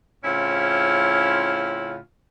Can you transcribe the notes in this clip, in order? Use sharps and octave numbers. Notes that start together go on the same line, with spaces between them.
A2 C#3 C4 C#4 E4 F4